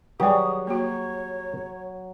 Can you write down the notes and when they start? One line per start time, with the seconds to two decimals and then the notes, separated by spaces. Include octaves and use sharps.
0.20 D#3 F#3 G3 G4 G#4 D5 D#6
0.67 A#3 F#4 C#5